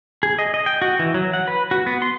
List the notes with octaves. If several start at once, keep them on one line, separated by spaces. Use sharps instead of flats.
G#4
D#5
D#5
G5
F#4
E3
F#3
F#5
B4
F#4
B3
C6